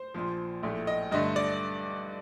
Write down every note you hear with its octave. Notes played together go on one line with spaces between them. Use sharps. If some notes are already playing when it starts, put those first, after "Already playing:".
Already playing: C5
A#1 A#2 F3
A#1 A2 A3
D#5
G2 D3 A3 D#5
D5